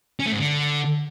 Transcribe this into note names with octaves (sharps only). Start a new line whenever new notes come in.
C#4
A3
G#2
D3